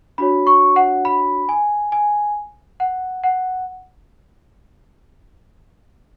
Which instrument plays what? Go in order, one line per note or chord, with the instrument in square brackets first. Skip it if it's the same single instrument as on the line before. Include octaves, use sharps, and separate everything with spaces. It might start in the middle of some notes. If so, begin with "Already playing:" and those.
[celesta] D4 F#4 C#5 B5
C#6
F#5
B5
G#5
G#5
F#5
F#5